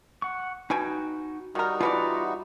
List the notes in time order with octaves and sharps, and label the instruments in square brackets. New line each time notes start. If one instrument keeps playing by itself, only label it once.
[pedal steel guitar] F#5 C#6
[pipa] B2 G5 G#5 [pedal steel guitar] D#4 F#4
[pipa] D#3 A#4 [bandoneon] G3 D#4 F#4
[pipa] B2 E3 D5 [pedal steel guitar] F4 F#5 A#5